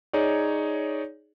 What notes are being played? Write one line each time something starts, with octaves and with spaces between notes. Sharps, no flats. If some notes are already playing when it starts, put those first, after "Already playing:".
D#4 G#4 C#5 D5